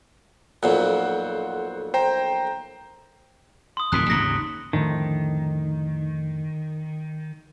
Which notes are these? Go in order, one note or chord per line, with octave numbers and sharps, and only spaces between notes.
B1 F2 A#2 C5 F#5
C5 G5 A#5
C6 D#6
D1 F2 D#3 F#6 B6
G#1 D#2 C#3 A#6
F2 A2 D3 D#3